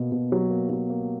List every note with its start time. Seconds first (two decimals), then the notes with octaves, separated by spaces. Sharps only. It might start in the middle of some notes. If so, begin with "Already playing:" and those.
Already playing: B2 A#3
0.12 B2
0.32 F#3
0.50 A#3
0.70 F#3
0.90 A#3